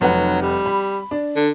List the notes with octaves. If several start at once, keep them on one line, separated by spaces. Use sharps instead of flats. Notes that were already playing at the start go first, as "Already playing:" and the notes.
F1 F#3 B4 F#5
G3
B5
D4
D3